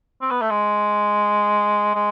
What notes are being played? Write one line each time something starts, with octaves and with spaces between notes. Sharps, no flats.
C4
B3
A3
G#3
G#3